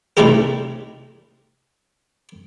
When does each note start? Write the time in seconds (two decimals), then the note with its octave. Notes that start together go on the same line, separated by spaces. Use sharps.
0.17 C3 A3 D#4 E4 G4 A#4